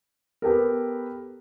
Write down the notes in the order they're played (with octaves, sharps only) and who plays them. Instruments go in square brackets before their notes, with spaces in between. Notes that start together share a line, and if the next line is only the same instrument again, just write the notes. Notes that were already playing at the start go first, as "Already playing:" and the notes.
[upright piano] B3 G4 A4 A#4